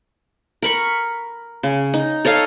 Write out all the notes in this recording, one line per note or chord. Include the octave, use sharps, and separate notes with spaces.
A#4 B5 C#6
C#3
D#4
A4 C#5 D#5 F5